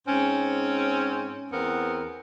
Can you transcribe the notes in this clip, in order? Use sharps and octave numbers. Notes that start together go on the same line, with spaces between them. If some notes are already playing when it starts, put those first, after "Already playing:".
G#2 C4 C#4
E2 B3 C4 A#4